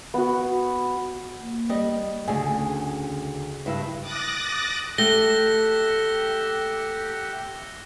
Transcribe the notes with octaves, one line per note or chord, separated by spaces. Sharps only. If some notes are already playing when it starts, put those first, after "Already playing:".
B3 F#4
A#3
G3 D#5
D2 C#3 G#4 G#5
G2 E4
D6 D#6 F#6 A6 A#6
A3 G4 E5 F#5 A#6 G7